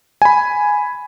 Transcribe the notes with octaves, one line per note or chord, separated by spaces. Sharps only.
G#5 B5